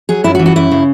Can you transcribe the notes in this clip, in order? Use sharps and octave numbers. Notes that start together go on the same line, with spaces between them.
F#3 G#4
F#2 E4
F#4
E3
F#4
F#2 E4
C#3